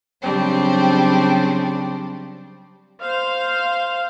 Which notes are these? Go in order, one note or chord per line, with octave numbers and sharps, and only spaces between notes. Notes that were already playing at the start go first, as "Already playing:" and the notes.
C#3 F#3 G3 C4 D4
C5 F5